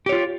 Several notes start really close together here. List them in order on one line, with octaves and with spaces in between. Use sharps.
G4 C#5 F4